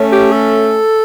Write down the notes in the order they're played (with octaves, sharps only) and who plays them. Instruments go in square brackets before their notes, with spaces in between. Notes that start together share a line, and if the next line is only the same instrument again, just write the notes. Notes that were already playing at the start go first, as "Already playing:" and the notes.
Already playing: [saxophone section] A3 C#4
[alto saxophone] G4
A4